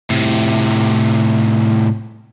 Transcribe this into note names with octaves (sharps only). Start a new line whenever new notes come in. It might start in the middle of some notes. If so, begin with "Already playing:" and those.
A2 C3